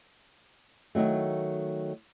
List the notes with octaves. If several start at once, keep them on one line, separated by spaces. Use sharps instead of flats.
D#3 E3 F#3 A3